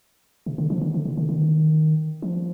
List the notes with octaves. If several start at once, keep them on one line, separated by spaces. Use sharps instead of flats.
C3
D3
F3
D#3
D3
C3
D3
D#3
F3